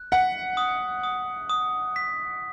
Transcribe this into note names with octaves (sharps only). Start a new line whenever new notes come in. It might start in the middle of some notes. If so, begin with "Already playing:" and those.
Already playing: F#6
F#5 B6
D#6
D#6
D#6
B6